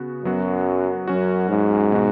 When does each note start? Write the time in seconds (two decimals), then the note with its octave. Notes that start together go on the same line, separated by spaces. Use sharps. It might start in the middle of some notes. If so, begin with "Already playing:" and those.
Already playing: C#3 B3 F#4
0.25 F#2 F#3 B3 F#4
1.07 F#2 F#3 C#4 F#4
1.49 G#2
1.91 B2 B3 D#4 F#4